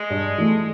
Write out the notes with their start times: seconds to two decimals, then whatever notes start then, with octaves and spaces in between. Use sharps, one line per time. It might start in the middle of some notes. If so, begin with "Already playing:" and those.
Already playing: G#3
0.10 G2
0.38 E3 A3